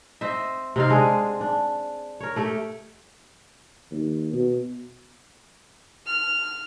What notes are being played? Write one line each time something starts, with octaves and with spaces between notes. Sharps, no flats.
C4 C5 D#5 E5
C3 C4 D#4 F5
G#3 D4 G#4
D4
A#4 C#5
A3 G4 A4
D#2
B2
F6